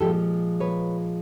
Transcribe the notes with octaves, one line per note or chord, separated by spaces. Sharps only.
A#2 F3 G#3 G4 A4
B4 C#5